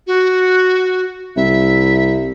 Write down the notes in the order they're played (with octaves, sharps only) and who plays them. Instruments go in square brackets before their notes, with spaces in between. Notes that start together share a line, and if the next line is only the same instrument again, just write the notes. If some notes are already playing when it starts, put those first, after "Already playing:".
[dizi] F#4
[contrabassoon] C2 [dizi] E5